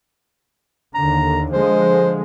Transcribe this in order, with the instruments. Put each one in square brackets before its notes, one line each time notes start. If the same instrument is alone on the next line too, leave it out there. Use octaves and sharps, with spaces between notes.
[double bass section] D#2 D3 [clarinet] A#5
[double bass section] D3 F3 G#3 [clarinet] C5